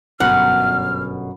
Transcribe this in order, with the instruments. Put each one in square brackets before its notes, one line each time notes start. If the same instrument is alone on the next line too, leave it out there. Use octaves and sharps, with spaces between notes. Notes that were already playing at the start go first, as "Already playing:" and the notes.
[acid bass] G1 [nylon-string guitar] F#2 B2 [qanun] F#5 [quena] F6